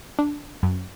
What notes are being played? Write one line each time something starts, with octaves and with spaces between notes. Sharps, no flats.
D4
F#2